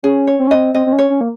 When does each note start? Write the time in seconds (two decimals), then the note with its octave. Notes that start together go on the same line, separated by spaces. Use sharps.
0.03 C#4 G#4
0.27 C#5
0.39 C4
0.47 C#4
0.51 C4 D#5
0.74 C4 D#5
0.87 C4
0.93 C#4
0.99 C#5
1.10 C#4
1.21 A#3